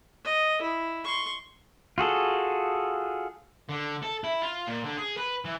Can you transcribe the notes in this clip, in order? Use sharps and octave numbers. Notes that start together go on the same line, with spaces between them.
D#5
E4
C6 C#6
F4 F#4 G#4 A4
D3
A4
E4
F4
A#2
D3
G#4
B4
E3